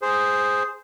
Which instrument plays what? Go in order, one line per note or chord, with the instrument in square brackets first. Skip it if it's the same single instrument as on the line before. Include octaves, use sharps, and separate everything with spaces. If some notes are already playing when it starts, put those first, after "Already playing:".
[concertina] G#4 C5